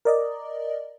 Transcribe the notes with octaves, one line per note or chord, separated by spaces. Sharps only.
A#4 D5 D#5